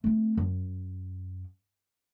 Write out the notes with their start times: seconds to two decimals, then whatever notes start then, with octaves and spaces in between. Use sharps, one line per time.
0.04 A3 C4
0.37 F#2